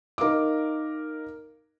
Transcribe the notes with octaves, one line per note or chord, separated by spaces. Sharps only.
D#4 A#4 F5 D6